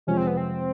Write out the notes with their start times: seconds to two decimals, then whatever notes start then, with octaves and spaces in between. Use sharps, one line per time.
0.07 F2 C3 F3 G#3 C#4
0.17 C4
0.27 B3
0.37 C4